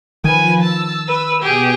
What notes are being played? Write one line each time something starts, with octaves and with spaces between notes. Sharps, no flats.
D#3 F3 B4 G#5
A5 E6
B4
B2 G4 G#4